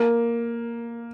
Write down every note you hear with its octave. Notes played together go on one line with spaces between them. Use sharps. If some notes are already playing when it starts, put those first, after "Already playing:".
Already playing: A#3